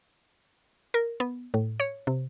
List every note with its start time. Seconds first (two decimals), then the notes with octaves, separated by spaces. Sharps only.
0.94 A#4
1.20 B3
1.54 A2
1.80 C#5
2.07 C3